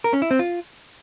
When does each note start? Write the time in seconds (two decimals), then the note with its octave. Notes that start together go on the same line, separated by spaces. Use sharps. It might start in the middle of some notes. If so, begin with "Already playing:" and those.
0.04 A#4
0.13 C#4
0.22 E4
0.31 C4
0.39 F4